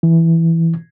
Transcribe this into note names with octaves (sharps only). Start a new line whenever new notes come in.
E3